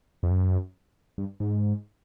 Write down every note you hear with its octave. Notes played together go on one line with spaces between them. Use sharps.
F2
F#2
G2
G#2